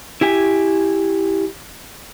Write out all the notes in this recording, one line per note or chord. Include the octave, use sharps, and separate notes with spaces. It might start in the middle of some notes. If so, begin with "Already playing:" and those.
E4 G4 G#5